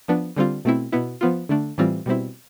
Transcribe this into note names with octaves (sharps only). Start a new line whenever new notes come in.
F3 B3 D4
D3 G3 C4 F4
B2 A3 C4 E4
B2 B3 E4
F3 B3 F4
D3 A3 D4
A2 E3 G3 C4 F4
B2 G3 C4 E4